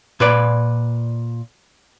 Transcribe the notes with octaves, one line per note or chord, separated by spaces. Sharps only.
A#2 B4 D5